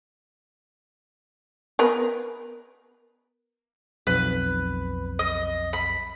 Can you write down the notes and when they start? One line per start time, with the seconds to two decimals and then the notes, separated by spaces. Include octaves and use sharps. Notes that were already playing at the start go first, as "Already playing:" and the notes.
1.79 B3 A#4 B4
4.07 B1 F2 B4
5.19 D#5
5.73 B5